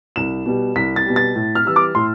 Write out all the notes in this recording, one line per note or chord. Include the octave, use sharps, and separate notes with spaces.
C2 E7
B2 G3
C2 B6
A6
B2 G3
A6
A2
F6
E3 G3 E6
D6
A2 C6